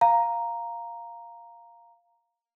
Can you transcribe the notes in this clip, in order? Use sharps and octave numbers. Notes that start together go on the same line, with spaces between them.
F5 A#5